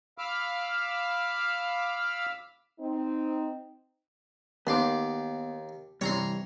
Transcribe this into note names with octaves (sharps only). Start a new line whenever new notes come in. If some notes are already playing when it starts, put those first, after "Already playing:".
F5 B5 D6 E6 F6
C4 D#4
D#2 B3 C6 D6
G2 C3 E3 C#5 A#5 C6